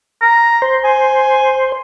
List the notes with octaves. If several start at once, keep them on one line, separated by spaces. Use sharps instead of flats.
A#5
C5
G#5